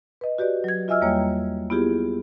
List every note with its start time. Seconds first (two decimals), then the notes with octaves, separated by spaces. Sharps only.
0.21 B4 D#5
0.38 F#4 G4 B4 D5
0.64 F#3 G#6
0.88 F4 D#5 E5 G#5 E6 F6
1.02 E2 G3 A#3 C#5 G5 A#5
1.70 B3 E4 F4 G4 G#4